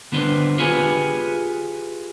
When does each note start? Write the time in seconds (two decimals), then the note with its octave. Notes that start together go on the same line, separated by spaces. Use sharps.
0.12 D3 B3 D4 B4 C5
0.58 F4 G4 G#4 B4 C#5 G#5